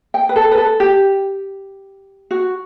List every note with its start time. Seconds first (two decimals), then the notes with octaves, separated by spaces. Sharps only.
0.14 G5
0.29 B4
0.36 A4
0.51 B4
0.57 A4
0.80 G4
2.31 F#4